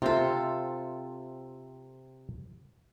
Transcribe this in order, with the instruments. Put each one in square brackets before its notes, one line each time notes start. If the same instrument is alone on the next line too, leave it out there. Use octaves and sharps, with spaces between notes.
[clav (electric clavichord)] C3 C4 E5 [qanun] F4 A4